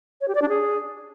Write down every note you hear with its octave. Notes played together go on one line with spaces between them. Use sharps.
C#5
G4
D5
D4
G#4